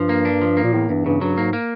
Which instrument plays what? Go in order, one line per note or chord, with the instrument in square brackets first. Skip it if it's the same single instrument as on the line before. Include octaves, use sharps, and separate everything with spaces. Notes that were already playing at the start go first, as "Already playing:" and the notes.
Already playing: [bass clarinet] G2 [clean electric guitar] F3
[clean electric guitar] A#3
D4
F3
A#3
[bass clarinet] A#2
[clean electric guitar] E2 [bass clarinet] A2
[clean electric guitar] E2 [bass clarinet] G2
[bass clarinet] G2 [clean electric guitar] C#3
[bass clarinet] G2 [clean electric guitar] F#3
[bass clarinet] G#2 [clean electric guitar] A#3
[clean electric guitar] A#3